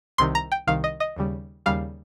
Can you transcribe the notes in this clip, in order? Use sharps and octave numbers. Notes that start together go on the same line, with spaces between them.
C2 C3 D#3 C6
A#5
G5
C2 C3 D#3 F5
D#5
D#5
D#2 C#3 G3
D#2 C#3 G3 F5